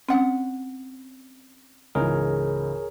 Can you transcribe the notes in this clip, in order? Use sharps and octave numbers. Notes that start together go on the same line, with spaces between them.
C4 C#4 F#5
C#2 G#2 E3 G#4 A#4 C#5